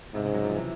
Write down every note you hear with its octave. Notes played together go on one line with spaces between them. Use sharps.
G#2 C3
C#3
F#3
F3
E3